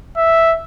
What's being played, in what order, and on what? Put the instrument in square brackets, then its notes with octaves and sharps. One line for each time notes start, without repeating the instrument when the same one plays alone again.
[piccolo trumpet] E5